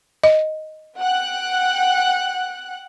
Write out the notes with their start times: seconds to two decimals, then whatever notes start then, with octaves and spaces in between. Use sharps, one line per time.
0.24 D#5
1.00 F#5 G5 F#6